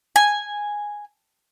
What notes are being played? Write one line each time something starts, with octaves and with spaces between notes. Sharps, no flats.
G#5